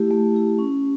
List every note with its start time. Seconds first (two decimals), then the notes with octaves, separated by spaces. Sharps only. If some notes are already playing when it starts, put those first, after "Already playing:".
Already playing: A3 E4 G4
0.11 A3
0.35 E4 G4
0.59 C#4